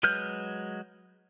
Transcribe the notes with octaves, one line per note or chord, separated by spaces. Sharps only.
F#3 G#3 B4 F6 G6